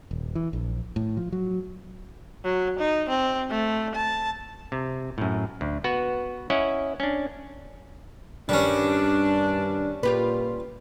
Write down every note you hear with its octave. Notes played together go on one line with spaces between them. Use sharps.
D#1
E3
A#1
A2
F3
F#3
F#3
D#4
C4
A3
A5
C3
F#2 A2
D2
B3 F#4 B4
C#4 E4 C#5 D#5 F#5
C#4 D4
G2 D#3 G3 C#4 D4
A#2 F4 G4 B4